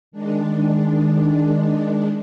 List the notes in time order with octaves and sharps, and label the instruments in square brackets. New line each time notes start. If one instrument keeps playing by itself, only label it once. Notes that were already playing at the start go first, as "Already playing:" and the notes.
[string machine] D#3 G#3 D4